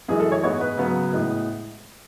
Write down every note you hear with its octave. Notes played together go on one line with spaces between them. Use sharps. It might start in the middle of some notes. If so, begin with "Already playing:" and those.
F#2 E3 G#3 G#4
A4
C#5
G#2 G#3 B3 C#5
B4
C#3 F#3 B3
A2 G#3 B3